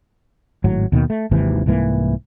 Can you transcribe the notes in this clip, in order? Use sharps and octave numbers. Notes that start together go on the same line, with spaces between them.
G#1 A2 F#3
D#2 B2 D#3
A3
G#1 D#2 C3 E3
C2 G#2 E3 A#3